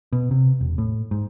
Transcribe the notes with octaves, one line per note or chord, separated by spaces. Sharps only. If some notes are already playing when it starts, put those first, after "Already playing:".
B2
C3
E1
A2
G#2